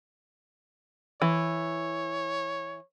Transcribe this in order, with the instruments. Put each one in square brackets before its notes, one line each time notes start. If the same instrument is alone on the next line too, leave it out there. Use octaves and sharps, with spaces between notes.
[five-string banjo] E3 [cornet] C#5